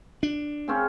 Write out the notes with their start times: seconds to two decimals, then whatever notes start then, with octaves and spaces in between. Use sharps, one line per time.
0.23 D4
0.68 C#3 C4 C#4